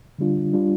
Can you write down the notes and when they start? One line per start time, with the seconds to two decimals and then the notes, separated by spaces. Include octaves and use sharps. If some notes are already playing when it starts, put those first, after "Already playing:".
0.19 D3 G3 D4 F4
0.53 G3 D4 F4